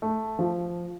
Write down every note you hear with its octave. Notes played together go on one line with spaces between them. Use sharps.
A3
F3